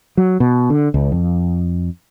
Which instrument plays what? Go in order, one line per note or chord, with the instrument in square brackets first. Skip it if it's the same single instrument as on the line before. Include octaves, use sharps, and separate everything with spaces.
[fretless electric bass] F#3
B2
D3
C#2
F2